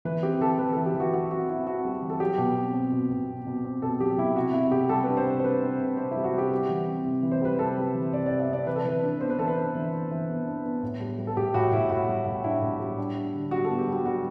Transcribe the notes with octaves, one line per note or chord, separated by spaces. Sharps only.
E3 B4
C4 G4
E3 A4
E3 B4
E3 A4
G4
E3
F#4
E3 F#4
C4 F#4
C4 E4
C4 F#4
G3
E3
A4
F#3 G4
B2
C4
C4
B2
B2
C4
B2
C4
B2 A4
F#3 G4
B2 E4
C3 F#4
C3 E4
C3 G4
G3 A4
D4 B4
C5
C3
C5
D4 B4
C3
C3
C3 C5
E4
G3
F#4
C3 G4
G3
E3
C4
C3
E3
C5
G3 B4
C3 A4
G3
E3
C3 D5
D5
C3
E5
C3 D5
E3 B4
A4
E3 B4
D4
B3 C5
B4
E3 A4
B4
D4
E3
E3
E3
B3
D4
B3
A2
G3
G3
A4
A2 G4
A2 F#4
A2 E4
A2 F#4
G3
A2
D4 E4
A2
G3
D4
D4
D3
G3 F#4
A4
B3
G4
G3
F#4
G3 F#4